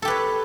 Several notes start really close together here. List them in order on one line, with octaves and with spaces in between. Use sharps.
A4 G4 B4 C#5